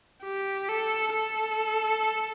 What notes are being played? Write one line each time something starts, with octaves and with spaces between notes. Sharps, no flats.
G4
A4
A4